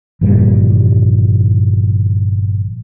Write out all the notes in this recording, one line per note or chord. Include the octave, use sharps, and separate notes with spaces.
G1 F2 A#2 G3